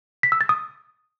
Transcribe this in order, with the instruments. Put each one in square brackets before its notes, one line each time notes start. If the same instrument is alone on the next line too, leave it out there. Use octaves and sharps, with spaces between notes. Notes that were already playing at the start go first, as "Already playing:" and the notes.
[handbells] B6
E6
A6
D#6